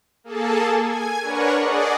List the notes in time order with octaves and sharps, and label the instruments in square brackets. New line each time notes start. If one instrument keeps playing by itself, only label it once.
[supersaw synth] A#3 G#4 A4 A5
G#5 G#6
D4 A#4 B4 C#5 F#5 C#6
G#4 D5 D#5 F#5